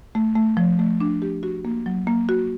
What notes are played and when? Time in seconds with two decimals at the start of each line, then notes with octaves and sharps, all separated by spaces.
0.15 A3
0.36 A3
0.57 F3
0.79 A3
1.01 D4
1.22 G4
1.43 F#4
1.65 A#3
1.86 F#3
2.07 A#3
2.29 F#4